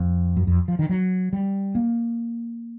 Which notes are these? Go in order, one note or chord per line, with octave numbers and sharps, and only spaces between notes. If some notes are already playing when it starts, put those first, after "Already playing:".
Already playing: F2
F#2
F2
F3
D#3
F#3
G3
A#3